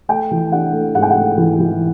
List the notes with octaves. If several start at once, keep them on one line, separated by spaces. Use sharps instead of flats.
A3 G5
E3
D4 F#5
A3
G#2 F#5
G5
F#5
A3
E3
E3